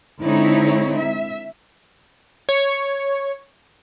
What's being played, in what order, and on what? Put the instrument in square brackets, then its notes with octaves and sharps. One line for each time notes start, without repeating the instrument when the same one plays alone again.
[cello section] D3 G#3 C4 D#4 E4 C#5
E5
[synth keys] C#5